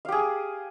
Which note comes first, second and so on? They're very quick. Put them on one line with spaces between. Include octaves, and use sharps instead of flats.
F5 G4 G#4